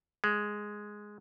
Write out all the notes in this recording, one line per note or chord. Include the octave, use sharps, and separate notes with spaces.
G#3